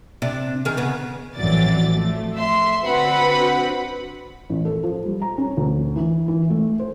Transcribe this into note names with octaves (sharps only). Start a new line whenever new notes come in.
C3 D4
D#3 G#4 A#4
C#3 B3
A1 F2 E3 F#3 D5 A6
F3 A3
E5 C6
D3 C4 F#4 B4 F#5 B5
A1
A4
F3
G3
A#5
C#4
D2
E3
E3
A3
C5